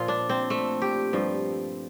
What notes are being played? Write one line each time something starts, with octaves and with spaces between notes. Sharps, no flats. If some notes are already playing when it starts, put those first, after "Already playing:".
Already playing: A#2 F3 F4
D4
C4
A3
G4
G2 F3